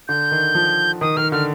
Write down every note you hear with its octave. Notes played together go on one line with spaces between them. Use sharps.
D3 G6
D#3
F3
D#3 D#6
D#3 F6
D3 F6